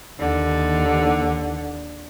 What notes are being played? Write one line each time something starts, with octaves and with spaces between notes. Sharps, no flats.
D#2 D3